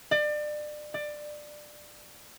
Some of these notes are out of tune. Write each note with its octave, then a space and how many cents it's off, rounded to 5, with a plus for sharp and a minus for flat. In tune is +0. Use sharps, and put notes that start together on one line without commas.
D5 +30
D5 +20